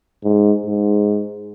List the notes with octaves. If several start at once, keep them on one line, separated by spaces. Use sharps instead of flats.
G#2
G#2